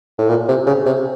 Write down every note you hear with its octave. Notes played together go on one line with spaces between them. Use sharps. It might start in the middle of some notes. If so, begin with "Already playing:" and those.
A2
A#2
C3
C#3
C3